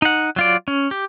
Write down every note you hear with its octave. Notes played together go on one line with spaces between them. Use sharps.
D#4 F#5
F#3 F4 D5
C#4
G4